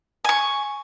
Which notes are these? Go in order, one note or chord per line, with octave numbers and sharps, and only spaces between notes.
G#5 C#6